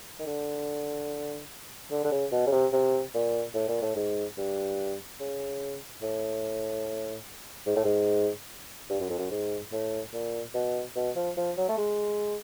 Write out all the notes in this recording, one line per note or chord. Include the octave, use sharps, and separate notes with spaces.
D#3
D3
D3
D3
C#3
B2
C#3
C3
C3
A#2
A2
A#2
A2
G#2
G2
C#3
A2
G#2
A2
G#2
G2
F#2
F2
F#2
G#2
A2
A#2
B2
B2
F3
F3
F#3
A3
G#3